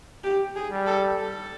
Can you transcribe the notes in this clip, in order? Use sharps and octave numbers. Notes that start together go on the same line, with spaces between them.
G4
G#4
G3
A4
A4